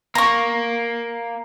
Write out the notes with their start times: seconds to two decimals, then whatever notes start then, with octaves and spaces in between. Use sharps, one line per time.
0.15 A#3 A#5 C#6